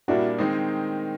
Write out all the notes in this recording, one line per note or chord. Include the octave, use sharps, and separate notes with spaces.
A#2 G3 A#3 D4 E4 F#4
D#3 G#3 C4 D#4